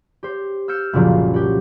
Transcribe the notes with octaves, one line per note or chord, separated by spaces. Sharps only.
G4 C5
E6 F6 G6 C#7 E7
F#1 C2 A#2 F3
F#4 G4